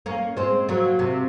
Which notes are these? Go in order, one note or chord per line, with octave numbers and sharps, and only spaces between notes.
A#3 C#4
G#3 C4
F#3 A#3
C3